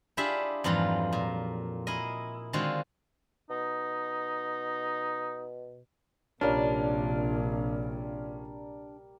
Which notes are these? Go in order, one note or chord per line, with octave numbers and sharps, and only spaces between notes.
D4 E4 F4 G4 G#4 E5
F2 G#2 E3 F#3 G3 F4
A#2
E4 G#4 A#4 D#5
D3 D#3 G#3 C4 F4 F#4
B2 D#4
A#1 C3 G3 C#4 D4 F4 A#4